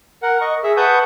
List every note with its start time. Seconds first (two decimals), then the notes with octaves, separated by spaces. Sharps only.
0.23 A#4 F#5
0.41 D#5 C#6
0.63 G#4 E5
0.77 B4 F#5 A5 C#6 D#6 G6